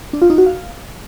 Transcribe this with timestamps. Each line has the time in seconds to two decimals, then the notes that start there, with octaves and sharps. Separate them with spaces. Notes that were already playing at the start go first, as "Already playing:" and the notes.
0.13 D4
0.22 F4
0.30 D#4
0.38 F#4
0.46 F5